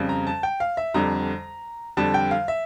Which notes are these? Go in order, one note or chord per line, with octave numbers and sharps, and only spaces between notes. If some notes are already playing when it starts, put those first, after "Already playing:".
Already playing: F2 C#3 G3
A#5
A5
G5
F5
E5
F2 D3 G3 A#5
F2 D3 G3 A5
G5
F5
E5